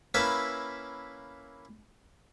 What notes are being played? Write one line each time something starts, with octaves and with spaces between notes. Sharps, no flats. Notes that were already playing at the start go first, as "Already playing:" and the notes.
A#3 C#4 E4 B4 E5 A5